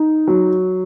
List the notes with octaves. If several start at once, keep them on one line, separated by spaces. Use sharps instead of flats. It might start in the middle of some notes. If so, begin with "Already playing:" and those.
Already playing: D#4
F#3